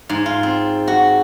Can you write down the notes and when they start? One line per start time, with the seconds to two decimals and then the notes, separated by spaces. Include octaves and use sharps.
0.09 G#2
0.26 F4
0.43 C4
0.88 F#4